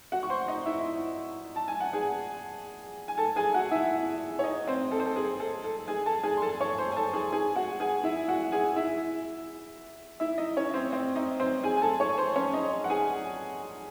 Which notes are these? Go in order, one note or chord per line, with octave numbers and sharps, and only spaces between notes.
F#4 F#5
C#6
C5 C6
D#4 D#5
E4 E5
A5
G#5
F#5
G#4 G#5
G#5
A4 A5
G#4 G#5
F#4 F#5
E4 E5
C#5
D#4 D#5
C4 C5
A4
C5
A4
G#4
A4
A4
G#4 G#5
A4 A5
G#4 G#5
C6
A4 A5
C#5 C#6
C5 C6
G#5
A4 A5
G#4 G#5
G#4 G#5
F#4 F#5
G#4 G#5
E4 E5
F#4 F#5
G#4 G#5
E4 E5
E4 E5
D#4 D#5
C#4 C#5
C4 C5
C4 C5
D#4 D#5
C4 C5
G#4 G#5
G#5
A4 A5
C#5 C#6
C5 C6
C#4 C#5
D#4 D#5
F#5
G#4 G#5